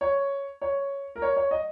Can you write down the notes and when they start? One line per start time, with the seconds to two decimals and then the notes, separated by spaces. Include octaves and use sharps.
0.01 C#5
0.61 C#5
1.16 A#4
1.22 C#5
1.36 C#5
1.51 D#5